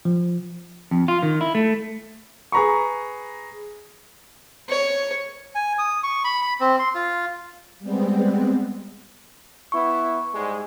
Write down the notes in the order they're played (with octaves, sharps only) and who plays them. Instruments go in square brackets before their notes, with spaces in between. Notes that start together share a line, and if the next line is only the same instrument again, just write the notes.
[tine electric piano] F3
[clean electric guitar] F2
F4
D#3
E4
A3
[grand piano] G#4 B4 A#5 B5 C#6
[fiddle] C#5
[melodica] G#5
D#6
C#6
B5
B5
C4
C6
F4
[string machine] G3 G#3 B3 C4
[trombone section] B3 E4 [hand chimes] C#6
[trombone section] G#2 G3 G#3